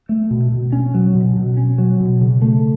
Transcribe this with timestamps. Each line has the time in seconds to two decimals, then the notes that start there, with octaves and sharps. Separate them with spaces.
0.09 A3
0.31 B2
0.52 B2
0.72 C#4
0.94 F#3
1.15 B2
1.37 B2
1.57 C#4
1.78 F#3
2.00 B2
2.21 C#3
2.42 A3